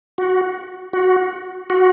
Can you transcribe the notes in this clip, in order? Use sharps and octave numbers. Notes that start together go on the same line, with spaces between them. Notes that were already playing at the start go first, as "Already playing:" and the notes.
F#4
F#4
F#4